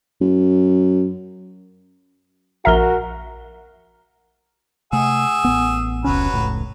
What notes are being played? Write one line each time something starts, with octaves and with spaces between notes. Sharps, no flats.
F#2
A#1 F#4 A#4 E5 A#5 F6 G7
C3 A3 G#4 F#5 E6
A1 B3
F1 C#2 F#3 C#4 B4
F1 C#2 A2